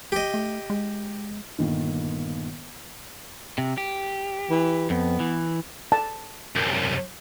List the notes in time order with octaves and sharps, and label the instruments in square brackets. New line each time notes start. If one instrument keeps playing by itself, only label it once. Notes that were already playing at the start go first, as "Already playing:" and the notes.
[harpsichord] G4 D#5
[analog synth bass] A3
G#3
[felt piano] G1 A#2 D#3
[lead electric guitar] C3
G4
[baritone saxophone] E3
[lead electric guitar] F2 [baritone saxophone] B3
[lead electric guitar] E3
[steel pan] A5
[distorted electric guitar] C2 F#2